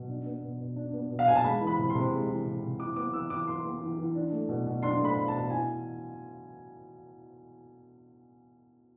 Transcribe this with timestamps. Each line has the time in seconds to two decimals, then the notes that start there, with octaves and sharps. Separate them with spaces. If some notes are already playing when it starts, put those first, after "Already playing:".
Already playing: B2
0.09 D4
0.26 B3
0.42 B2
0.60 B2
0.76 D4
0.93 B3
1.10 B2
1.19 F5
1.28 B2 G#5
1.36 A5
1.44 G#3 B5
1.61 E3
1.67 B5
1.78 C3
1.90 C6
1.95 C3
2.12 G#3
2.29 E3
2.45 C3
2.63 C3
2.79 E4 D6
2.96 B3 D6
3.13 E3 E6
3.30 E3 D6
3.47 E4 C6
3.64 B3
3.81 E3
3.98 E3
4.15 D4
4.32 A3
4.48 B2
4.66 B2
4.82 D4 C6
4.99 A3
5.05 B5
5.16 B2
5.28 A5
5.34 B2
5.50 E4 G#5